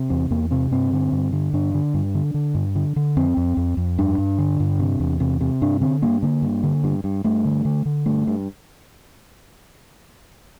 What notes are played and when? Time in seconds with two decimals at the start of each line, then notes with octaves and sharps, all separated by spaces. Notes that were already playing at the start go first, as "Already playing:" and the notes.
Already playing: C3
0.10 E2 C4
0.30 E2 A#3
0.51 C3 C4
0.71 G2 C4
0.92 D3
1.12 G2
1.32 D3
1.53 G2 D4
1.74 D3
1.94 G2
2.15 D3
2.34 D3
2.55 G2
2.76 D3
2.96 D3
3.17 F2 C4
3.37 F2
3.57 F2
3.77 F2
3.98 G2 D4
4.18 G2
4.39 D3
4.60 G2
4.80 C3
5.00 E2
5.20 C3
5.41 C3
5.62 G2 D4
5.81 D3 C4
6.02 G2 A#3
6.23 D3 A#3
6.42 G2
6.63 D3
6.84 G2
7.04 G2
7.24 G2 A3
7.45 D3
7.65 D3
7.86 D3
8.06 G2 A3
8.27 G2